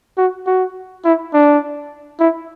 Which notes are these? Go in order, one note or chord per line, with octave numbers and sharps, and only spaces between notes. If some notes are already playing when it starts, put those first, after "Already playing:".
F#4
F#4
E4
D4
E4